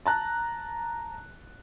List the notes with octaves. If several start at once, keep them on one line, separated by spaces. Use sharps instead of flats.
A5 A#5 F#6